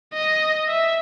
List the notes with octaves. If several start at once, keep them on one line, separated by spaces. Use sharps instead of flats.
D#5
E5